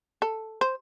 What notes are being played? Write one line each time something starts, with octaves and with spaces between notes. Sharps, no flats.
A4
C5